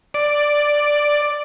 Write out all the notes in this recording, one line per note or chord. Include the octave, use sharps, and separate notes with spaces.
D5